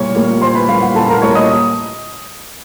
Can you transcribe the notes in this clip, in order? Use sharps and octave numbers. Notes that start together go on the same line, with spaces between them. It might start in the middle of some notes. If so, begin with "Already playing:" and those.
Already playing: A#2 G3 A#3 C#5 C#6
G3 A#3
A#2 C5 C6
B4 B5
G3 A#3 F5
F#5
A#2 A4 A5
A#4 A#5
G3 A#3 C#5 C#6
D#5 D#6